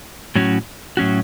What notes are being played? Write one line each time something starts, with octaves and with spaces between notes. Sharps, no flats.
A2 F#3 C#4 F#4
A2 F#3 C#4 F#4